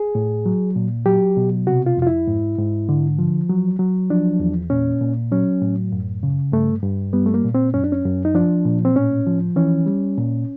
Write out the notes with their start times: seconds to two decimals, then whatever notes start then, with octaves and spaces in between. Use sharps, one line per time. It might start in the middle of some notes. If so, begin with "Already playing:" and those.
Already playing: G#4
0.15 A2
0.46 F#3
0.76 A#2
1.06 F#3 G4
1.37 B2
1.67 C3 F#4
1.86 F4
1.97 F2 F4
2.07 E4
2.27 G#2
2.58 G#2
2.89 D3
3.19 F3
3.50 F#3
3.79 F#3
4.10 F3 D4
4.40 E2
4.70 A#2 C#4
5.02 A#2
5.32 F#3 C#4
5.62 A2
5.92 F#2
6.23 C#3
6.52 G2 A3
6.83 G2
7.13 G3 B3
7.26 A3
7.34 A#3
7.44 A#2
7.55 C4
7.74 F#2 C#4
7.84 D4
7.92 C#4
8.05 F#2
8.25 D#4
8.35 F3 D4
8.66 A#2
8.85 C4
8.96 A2 C#4
9.27 F3
9.56 E3 C#4
9.86 G3
10.18 A#2